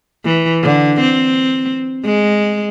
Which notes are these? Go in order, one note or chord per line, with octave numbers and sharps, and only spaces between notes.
E3
D3
C4
G#3